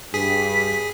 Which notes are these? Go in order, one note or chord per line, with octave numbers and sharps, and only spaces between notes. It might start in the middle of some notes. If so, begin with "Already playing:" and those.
G2 G#4 B6